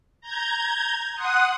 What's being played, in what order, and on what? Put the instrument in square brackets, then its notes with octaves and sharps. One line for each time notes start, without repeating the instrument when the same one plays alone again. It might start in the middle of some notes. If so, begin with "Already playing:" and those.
[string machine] A#5 G6 G#6
F#5 C6 D#6 F#6